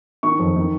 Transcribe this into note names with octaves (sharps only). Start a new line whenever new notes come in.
D#3 C#6
F2
D#3